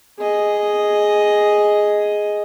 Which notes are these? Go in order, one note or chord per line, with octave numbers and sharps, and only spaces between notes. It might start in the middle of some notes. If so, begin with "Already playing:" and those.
G#4 D#5